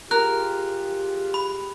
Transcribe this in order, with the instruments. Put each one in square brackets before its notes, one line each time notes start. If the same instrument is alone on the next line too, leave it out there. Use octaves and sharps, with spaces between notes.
[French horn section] F4 G4 G#4 [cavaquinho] A#4 [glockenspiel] F#6
[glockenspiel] B5